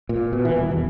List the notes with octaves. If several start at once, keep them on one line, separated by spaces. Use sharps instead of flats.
A#2
B2
E3
D#1
E2